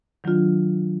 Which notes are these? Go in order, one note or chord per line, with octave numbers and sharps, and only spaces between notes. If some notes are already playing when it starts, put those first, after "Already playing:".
D#3 F#3 D4 F4